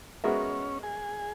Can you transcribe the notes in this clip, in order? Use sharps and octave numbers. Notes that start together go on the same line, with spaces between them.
G#3 B3 C#4 F#4 A#4 E5
G#4